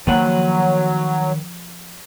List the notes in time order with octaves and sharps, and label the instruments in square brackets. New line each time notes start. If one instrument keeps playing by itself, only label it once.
[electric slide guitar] D#3 B4 F#5 [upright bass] F3 A#3 [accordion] F#3